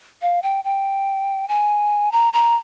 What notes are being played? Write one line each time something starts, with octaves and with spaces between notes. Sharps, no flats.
F5
G5
G5
G#5
A#5
A#5